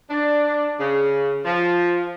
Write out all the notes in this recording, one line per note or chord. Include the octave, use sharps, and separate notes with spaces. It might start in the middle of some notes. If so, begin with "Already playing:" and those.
D4
C#3
F3